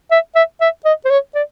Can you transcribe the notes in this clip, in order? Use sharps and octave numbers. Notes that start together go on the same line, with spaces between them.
E5
E5
E5
D#5
C5
C#5
D5